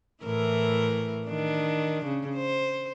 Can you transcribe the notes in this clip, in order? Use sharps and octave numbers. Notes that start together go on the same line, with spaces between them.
A2 E3 A#4
D#3 D4
C#3
C5